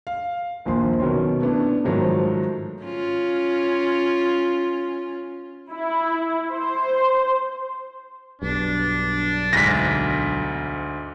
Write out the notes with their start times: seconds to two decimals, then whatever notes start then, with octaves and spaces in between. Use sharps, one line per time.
0.07 F5
0.65 A#1 D#2 F3 C6
1.00 B2 D#3 F#3 C#4
1.42 A3 B3 D4 E4
1.85 G#2 D#3 F3 F#3 A3
2.83 C#4 F4
5.71 E4
6.51 C5
8.42 B1 G2 D4
9.53 D2 G#2 A#6 B6